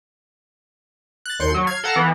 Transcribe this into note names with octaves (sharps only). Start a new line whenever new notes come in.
F#6 A6
D#2 C6 G6 C#7
F#3
F6 G#6 C7
A4 F5 F#5 A#5
E3 B3